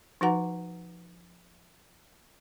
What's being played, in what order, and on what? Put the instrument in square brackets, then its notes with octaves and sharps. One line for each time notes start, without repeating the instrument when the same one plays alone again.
[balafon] F3 D#4 F#4 B4 F#5 A#5